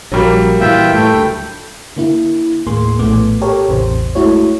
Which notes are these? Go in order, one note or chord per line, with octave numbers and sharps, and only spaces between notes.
A#1 F#3 G3 A#3
A#2 E3 F4 E5 G5
A2 A3 G5
D2
D3 A#3 E4
D#2 A2 A#3 G#4 C6
A#1 A2 A3 B3 D6
G4 A4 A#4 C#5
A1 E2 C3 C5
G#3 A3 E4 F#4 C#5